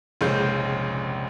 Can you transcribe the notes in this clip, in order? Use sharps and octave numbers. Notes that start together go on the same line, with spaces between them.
F1 A#1 C#3 G#3 G6